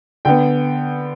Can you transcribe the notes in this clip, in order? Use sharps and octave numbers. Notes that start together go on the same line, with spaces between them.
D3 B3 G5